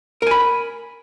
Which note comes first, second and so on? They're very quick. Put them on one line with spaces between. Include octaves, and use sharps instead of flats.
A#4 G#5 B5